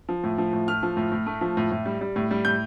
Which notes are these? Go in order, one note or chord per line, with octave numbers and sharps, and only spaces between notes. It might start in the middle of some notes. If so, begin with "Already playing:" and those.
F3
A2
F3
A2
A3 F6
F3
A2
A2
A3
F3
A2
A2
G3
G3
A2
G3
A2 G6